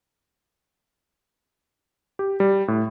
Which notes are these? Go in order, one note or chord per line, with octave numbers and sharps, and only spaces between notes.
G4
G3
A2